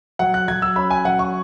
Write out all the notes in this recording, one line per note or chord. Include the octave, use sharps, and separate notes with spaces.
F#3 F#5
F#6
F#3 G#6
E6
C#4 B5
G#5
F#3 F#5
C#6